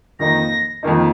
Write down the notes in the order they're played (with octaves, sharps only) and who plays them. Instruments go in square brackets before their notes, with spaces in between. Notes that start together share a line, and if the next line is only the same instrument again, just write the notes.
[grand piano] F2 D#3 A#3 D#4 [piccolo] A#6
[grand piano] F2 D#3 A#3 D#4